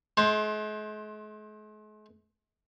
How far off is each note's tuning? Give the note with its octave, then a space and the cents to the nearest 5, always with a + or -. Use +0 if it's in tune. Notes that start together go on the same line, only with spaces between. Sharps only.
G#3 +45 C5 +15